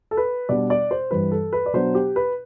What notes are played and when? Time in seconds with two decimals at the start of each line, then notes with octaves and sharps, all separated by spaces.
0.11 A4
0.17 B4
0.49 B2 G3 D4 D5
0.70 D5
0.91 C5
1.11 G2 E3 G3 B4
1.32 A4
1.53 B4
1.66 D5
1.73 B2 F#3 B3 D4 C5
1.95 G4
2.16 B4